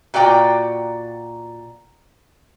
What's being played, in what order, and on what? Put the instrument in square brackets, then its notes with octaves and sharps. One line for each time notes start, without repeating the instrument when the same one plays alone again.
[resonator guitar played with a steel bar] A#2 F#4 D5 G5 A#5